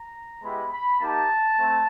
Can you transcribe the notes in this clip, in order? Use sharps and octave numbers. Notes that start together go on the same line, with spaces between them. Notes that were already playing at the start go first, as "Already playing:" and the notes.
Already playing: A#5
G#3 B3 E4 G4 B5
B5
A#3 D#4 G4 A5
A3 C4